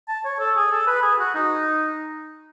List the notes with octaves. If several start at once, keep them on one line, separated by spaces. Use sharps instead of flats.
A5
C#5
A4
G#4
A4
B4
G#4
F#4
D#4